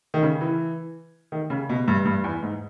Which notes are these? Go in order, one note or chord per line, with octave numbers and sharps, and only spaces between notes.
D#3
C#3
E3
D#3
C#3
B2
G2
G2
E2
G#2